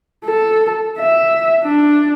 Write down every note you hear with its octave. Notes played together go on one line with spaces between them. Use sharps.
A4
E5
D4